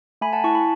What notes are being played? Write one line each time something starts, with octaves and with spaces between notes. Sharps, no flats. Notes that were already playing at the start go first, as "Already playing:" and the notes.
A3 G#5 B5
F#5 A5
E4 A5 C#6
G#5 B5